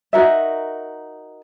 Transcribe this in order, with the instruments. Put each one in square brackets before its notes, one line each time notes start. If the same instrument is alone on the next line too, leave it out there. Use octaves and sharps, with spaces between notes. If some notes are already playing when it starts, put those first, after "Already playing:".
[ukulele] D#4 F#4 A#4 E5